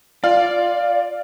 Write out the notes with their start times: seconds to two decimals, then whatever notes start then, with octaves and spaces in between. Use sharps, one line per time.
0.24 F4 D5